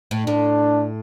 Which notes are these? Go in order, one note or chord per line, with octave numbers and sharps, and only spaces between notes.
A2
A2 D4